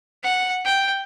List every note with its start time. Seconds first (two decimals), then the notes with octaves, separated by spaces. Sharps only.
0.23 F#5
0.65 G5